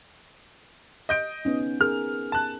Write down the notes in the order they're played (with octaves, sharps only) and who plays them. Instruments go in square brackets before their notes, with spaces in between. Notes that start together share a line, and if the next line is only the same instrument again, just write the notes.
[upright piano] D#5 G6 D7
[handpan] B3 C#4 D#4
[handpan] G#4 A#4 [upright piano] F6
[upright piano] A5 F#6